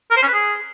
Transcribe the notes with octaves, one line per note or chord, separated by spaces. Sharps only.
A#4
C5
C#4
B4
G#4